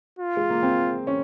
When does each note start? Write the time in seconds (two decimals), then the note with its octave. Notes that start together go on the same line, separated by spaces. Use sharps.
0.19 F4
0.37 G#3
0.50 A#3
0.62 C4
1.07 C#4